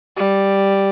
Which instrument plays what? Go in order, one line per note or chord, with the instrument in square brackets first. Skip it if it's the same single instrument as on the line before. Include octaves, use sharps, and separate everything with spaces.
[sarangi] G3